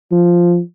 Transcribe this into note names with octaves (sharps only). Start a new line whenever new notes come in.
F3